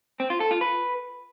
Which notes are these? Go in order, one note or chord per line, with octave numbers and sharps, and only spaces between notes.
C4
F4
A4
F4
B4